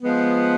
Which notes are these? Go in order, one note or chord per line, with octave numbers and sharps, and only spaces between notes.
F3 G#3 B3